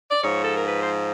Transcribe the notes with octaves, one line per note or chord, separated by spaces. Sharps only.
D5
G#2 F3 C#5
A4
A#4
B4
C5